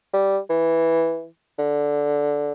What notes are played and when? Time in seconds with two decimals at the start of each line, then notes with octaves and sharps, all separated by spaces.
0.13 G3
0.50 E3
1.58 D3